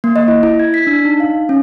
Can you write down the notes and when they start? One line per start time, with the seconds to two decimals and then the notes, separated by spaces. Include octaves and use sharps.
0.04 A#3
0.16 D#5
0.28 E4
0.43 E4
0.59 G#6
0.74 B6
0.87 D4
1.05 D#4
1.20 F5
1.49 C#4